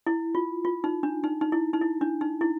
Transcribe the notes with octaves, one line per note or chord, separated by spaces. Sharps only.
E4
F4
F4
D#4
D4
D#4
D#4
E4
D#4
E4
D4
D#4
E4